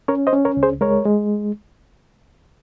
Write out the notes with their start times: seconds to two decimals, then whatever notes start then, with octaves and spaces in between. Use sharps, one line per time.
0.08 C#4 A#4 C#5
0.27 C5 D#5
0.33 C#4
0.45 A#4 C#5
0.57 C#2
0.63 G#4 C5
0.81 G#3 A#4 C#5
1.05 G#3